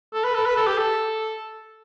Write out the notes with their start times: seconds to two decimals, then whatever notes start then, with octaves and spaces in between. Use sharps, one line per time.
0.14 A4
0.24 B4
0.35 A4
0.46 B4
0.56 A4
0.67 G4
0.78 A4